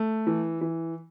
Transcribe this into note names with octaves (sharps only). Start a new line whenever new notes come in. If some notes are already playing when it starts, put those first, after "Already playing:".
Already playing: A3
E3
E3